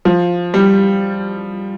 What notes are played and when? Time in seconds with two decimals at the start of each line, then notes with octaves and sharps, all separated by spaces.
0.05 F3
0.54 G3